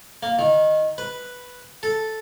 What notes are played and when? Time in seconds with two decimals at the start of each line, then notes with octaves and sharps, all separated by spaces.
0.23 A#3
0.39 D#3
0.98 B4
1.83 A4